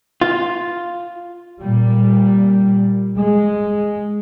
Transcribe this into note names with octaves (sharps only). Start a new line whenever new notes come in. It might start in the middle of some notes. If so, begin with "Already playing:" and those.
F4
A#2 G3
G#3